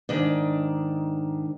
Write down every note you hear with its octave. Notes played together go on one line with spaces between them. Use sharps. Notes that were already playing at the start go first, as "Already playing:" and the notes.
G#2 D#3 D4